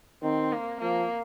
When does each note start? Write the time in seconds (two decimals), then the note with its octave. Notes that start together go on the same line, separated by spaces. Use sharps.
0.23 D#3 C4
0.52 A#3
0.81 F3 A#3